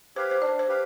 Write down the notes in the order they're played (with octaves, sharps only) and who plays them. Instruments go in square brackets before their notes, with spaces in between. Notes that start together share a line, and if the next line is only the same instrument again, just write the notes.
[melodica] G4 B4 F5 [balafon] C5
[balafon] C5
[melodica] D4 [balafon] D5
[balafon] C5
[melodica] G4 B4 F5